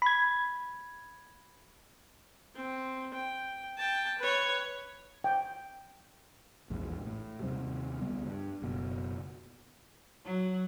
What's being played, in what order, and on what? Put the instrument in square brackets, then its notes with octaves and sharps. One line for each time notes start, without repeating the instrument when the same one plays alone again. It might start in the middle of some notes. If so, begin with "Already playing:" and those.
[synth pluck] B5 G#6
[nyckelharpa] C4
G5
G5 A5
B4 C#5
[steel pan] G5
[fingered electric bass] A#1 E2 G#2
A2
D#2 C3 G3
C#2 G3 B3
G2
F#1 B2
[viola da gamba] F#3